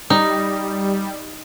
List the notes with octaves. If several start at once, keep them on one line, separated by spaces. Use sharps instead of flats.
G3 D#4